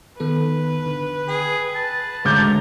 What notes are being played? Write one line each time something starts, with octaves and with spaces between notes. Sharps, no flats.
D#3 B3 A4 B4
D3
G#4 G5
A5
D2 G#3 C#5 A#5 D6 G6